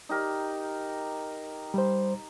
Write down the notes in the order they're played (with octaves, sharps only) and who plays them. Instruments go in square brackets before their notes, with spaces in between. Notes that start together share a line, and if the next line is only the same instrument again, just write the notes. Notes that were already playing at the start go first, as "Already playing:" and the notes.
[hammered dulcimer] D#4 G4 A#4
[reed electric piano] G3 C5